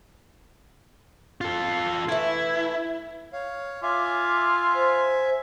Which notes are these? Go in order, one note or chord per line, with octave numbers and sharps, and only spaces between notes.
F4 A4
E3 A3 E4
C#5 F5
F4 E5 G#5 D6
C5